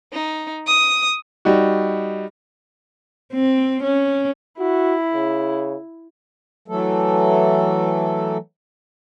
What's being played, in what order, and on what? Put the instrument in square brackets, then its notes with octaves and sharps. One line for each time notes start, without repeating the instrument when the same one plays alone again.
[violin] D#4
D#6
[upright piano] G3 D#4 F#4
[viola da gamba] C4
C#4
[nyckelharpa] E4 [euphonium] F#4
[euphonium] C#3
[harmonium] E3 F#3 A3 A4